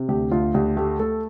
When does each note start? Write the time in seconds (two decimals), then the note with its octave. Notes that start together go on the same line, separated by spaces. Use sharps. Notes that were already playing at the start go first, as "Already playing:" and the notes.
Already playing: C3
0.08 D2 G4
0.31 D2 F4
0.54 D2 G4
0.77 A3 G4
0.99 A3 A4